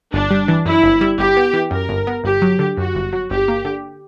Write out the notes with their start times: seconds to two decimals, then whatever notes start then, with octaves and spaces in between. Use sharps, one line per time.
0.13 G1 D4
0.30 G3
0.48 E3
0.65 F#2 E4
0.83 G1
1.01 G3
1.18 G1 G4
1.37 B3
1.54 E3
1.71 F#2 A#4
1.89 G1
2.07 B3
2.24 G1 G4
2.42 F#3
2.59 D3
2.77 F#2 F#4
2.95 G1
3.13 F#3
3.31 G1 G4
3.48 A#3
3.65 D3